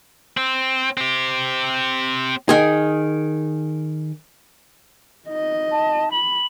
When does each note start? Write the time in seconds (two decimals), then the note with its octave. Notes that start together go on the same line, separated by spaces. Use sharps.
0.37 C4
0.97 C4 G4
2.49 D#3 G#4
5.28 D#4 D#5
5.72 A5
6.12 B5 F#7